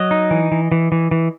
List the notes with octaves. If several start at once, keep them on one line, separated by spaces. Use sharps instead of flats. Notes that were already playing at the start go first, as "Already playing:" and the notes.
Already playing: F#3 D#5
D#4
E3
E3
E3
E3
E3